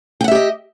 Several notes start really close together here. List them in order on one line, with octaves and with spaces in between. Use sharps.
G5 F#5 E5 G4 D#5